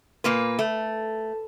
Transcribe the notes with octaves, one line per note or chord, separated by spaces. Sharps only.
A#2 A#3 B4
A3